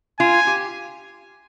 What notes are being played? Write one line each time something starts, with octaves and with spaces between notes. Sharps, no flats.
F4 G#5
G4